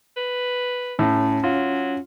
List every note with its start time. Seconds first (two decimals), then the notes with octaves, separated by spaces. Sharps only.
0.17 B4
0.99 A2 C#4
1.44 F#3 F4